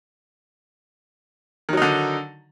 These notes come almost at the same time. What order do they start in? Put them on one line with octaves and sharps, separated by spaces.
D#3 F#3 D#4 D3